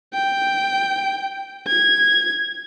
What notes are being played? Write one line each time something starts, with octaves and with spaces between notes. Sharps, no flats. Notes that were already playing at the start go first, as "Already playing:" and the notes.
G5
G#6